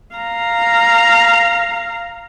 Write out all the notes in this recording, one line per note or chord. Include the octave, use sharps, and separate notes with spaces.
F5 A#5